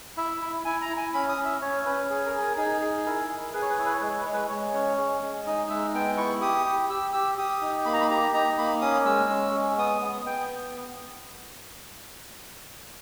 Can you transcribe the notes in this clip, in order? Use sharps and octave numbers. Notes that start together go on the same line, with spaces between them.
E4 E5
E4
E4 G#5
A#5
E4
G#5
C#4 B5
D#6
C#4
E5
C#4 C#5
C#4 B4
G#4
A#4
G#4
A#4
D#4 G#4
G#4
E4 A#4
G#4
G#4 B4
C#5
B4
E4 C#5
B4
C#5
G#3 B4
C#5
B4
G#3 C#5
B4
G#3 C#5
C#4
G#3
G#3
D#4 D#5
G#3 E5
B3 G5
E4 C#6
G4 D#6
G4
G4 E6
G4 E6
G4 D#6
D#4
A#3 B5
A#5
B5
G4 A#5
D#4 A#5
A#3 B5
C#4 D#6
G#3 E6
C#4
G#3
B3 D#6
B3
B3 G5